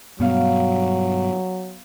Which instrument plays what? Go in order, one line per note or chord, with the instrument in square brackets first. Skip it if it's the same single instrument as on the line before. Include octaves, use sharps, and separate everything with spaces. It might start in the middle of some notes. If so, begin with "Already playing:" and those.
[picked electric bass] G2 B2 [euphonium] F#3 [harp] B3 F5